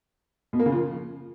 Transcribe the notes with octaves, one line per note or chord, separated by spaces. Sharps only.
B2
A#3
C#3
F3